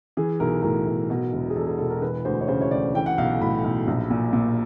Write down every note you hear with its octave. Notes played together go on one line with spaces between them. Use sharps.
E3 G#4
B1 A#4
A2 A#4
B1
B2
E1
G#4
E2 A4
G#4
E1 A4
A#4
E3 B4
D2 C5
C#5
C#3 C5
C#5
D2 D5
E3 G5
F#5
B1 F5
A2 B5
B1
A#1
A#2
A#2